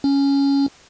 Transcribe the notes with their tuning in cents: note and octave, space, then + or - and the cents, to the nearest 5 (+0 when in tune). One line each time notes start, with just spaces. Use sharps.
C#4 +5